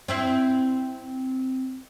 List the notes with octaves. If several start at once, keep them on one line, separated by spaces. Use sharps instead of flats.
C4 E4 C5